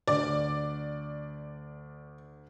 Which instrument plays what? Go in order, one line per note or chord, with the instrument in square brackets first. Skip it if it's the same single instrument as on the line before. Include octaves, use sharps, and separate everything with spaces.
[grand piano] D2 [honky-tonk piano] D5